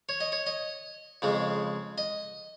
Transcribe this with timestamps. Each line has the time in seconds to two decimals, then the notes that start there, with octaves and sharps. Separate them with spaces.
0.09 C#5
0.20 D#5
0.32 C#5
0.47 D#5
1.22 F2 C#3 G#3
1.98 D#5